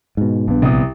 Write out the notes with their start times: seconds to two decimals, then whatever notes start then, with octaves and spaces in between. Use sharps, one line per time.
0.17 G#2 B2
0.48 A#1 G2 B3
0.62 C2 D#6